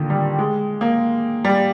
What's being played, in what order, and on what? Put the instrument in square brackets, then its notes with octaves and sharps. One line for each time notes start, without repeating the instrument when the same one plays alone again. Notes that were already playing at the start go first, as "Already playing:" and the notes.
Already playing: [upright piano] A#2 D3 D#3
G3
G#3
A#3
G3